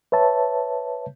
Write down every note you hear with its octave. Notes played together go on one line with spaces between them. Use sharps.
B4 C#5 E5 A5